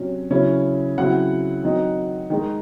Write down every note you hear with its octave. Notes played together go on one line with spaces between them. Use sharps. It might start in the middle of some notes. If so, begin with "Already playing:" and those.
Already playing: C3 F#3 C#4
C#3 F#3 C#4 E4
C#3 F#3 C4 E4 F#5
D#3 F#3 C4 D#4
D#3 G#3 D#4